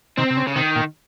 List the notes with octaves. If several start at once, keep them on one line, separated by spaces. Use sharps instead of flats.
C3 D#3 C4
C3
C#3
C#3
C3 D#3
A#2